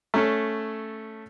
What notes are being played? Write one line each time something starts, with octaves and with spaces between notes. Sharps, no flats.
A3 C#4 A4